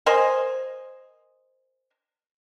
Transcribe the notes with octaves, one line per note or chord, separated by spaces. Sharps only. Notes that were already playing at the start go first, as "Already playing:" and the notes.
A#4 C5 D#5 G#5